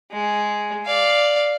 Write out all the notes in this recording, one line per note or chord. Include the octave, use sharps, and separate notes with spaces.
G#3
D5 F5